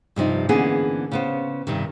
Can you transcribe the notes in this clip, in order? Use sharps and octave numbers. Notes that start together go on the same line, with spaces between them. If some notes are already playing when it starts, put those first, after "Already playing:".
G2 C3 F3 D#4
D3 E3 A#3 B3 C#4 G#4
C#3 B3 C5
G2 C3 D#3